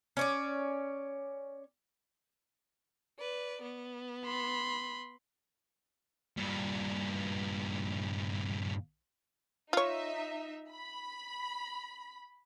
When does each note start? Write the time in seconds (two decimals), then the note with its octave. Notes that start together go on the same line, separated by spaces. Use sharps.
0.17 C#4 C#5 D5
3.17 B4 D5
3.61 B3
4.26 B5 C6
6.38 G2 A#2
9.73 D#4 F4 C#5 E5
10.71 B5